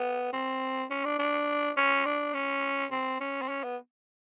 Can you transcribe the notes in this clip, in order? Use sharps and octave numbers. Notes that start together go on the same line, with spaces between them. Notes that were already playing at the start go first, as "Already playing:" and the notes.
Already playing: B3
C4
C#4
D4
D4
C#4
D4
C#4
C4
C#4
C4
C#4
B3